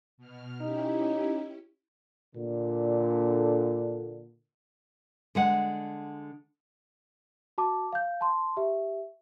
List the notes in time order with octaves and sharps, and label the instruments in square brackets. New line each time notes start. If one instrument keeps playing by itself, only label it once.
[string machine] B2 F6
[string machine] C#4 E4 G4 [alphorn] D#4
[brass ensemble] A#2 D3
[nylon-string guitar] D3 G#3 F#5
[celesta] F#4 A5 D6
F5 G6
A5 C6
G4 E5